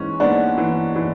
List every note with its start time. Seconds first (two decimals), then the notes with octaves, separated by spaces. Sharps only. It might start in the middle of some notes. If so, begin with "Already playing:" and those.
Already playing: G#2 E3 C#4
0.20 G#2 B3 D4
0.58 E3
0.96 E3